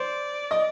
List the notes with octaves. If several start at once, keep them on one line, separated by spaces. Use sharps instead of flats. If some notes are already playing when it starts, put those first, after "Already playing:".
Already playing: C5 D5
D#5